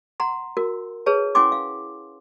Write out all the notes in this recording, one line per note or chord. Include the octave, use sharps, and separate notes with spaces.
F#5 A#5 C6
F#4 A#4
G#4 B4 C#5 A5
C#4 E4 F#5 G#5 C6 D6
F5